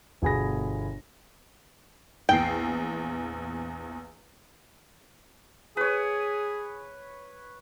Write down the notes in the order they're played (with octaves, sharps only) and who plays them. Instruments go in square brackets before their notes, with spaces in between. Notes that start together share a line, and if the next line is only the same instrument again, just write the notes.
[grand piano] G1 B2 G#4 G#5 B5 A#6
[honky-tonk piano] A#1 E2 C7 [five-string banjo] G5
[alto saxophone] G#4 [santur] B4 C#5